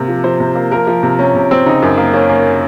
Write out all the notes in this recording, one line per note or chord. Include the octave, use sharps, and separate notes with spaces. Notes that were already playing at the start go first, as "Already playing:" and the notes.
Already playing: C3 A#3
F3
F3 C5
C3
A#3
F3 A#4
F3
C3
C3 C#4
C3
C4
C#3 D#4
F#2
A#3
A#3 C#4
A#3